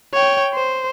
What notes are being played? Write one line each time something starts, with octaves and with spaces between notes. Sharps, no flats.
C#5 G5
C5